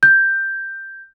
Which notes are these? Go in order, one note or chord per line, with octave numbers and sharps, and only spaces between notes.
G6